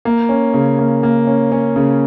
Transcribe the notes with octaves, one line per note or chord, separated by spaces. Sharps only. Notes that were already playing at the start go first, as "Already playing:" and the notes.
A#3
C#4
C#3
A#3
A#3
C#4
C#4
C#3